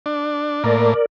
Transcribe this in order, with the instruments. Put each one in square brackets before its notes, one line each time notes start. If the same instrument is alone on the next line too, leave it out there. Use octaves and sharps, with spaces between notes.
[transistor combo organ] D4
[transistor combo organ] A2 A#3 [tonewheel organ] A#4 D5